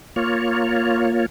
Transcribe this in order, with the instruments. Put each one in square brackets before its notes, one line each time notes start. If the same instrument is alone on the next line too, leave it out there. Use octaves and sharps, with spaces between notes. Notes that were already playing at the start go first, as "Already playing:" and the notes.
[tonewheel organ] A#3 F4 C#5